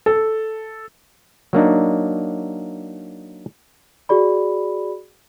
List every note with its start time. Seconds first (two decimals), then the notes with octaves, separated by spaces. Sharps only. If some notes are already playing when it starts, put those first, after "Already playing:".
0.06 A4
1.53 F#3 A#3 D4 D#4
4.09 F#4 G#4 D5 B5